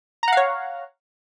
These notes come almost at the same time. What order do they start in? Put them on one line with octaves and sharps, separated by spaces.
A#5 F#5 F5 C#5